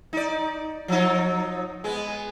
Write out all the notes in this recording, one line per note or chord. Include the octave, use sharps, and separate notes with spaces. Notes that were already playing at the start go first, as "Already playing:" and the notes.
D#4 D5
F3 F#3 D#4
G#3 B3